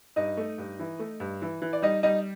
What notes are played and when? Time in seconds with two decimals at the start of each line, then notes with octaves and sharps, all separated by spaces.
0.16 G2 D#4 D#5
0.37 A3
0.58 G2
0.79 E3
0.99 A3
1.20 G2
1.42 E3
1.62 E3
1.73 D5
1.82 G3 D#4 D#5
2.03 G3 D#4 D#5